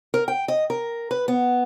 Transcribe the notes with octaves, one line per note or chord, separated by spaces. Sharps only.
A#4
G5
D#5
A#4
B4
B3